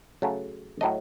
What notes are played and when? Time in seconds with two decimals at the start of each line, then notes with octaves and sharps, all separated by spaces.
0.22 C#3 F#3 A3
0.81 A2 F#3 A3 D#5